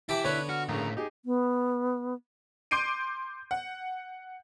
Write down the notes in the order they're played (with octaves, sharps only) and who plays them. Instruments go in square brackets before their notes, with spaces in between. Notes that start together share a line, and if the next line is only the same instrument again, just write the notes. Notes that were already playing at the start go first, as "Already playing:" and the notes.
[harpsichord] E3 G4 A5 [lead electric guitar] E4 [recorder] E5
[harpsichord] D3 B3 [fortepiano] C#5 [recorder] F#6
[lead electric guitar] F#4 [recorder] F6
[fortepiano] A#1 C#3 [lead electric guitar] A2 [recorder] A#5
[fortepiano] D#4 G4 [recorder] G#4
[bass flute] B3
[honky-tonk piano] C6 D6 G6 C7 D7 D#7
F#5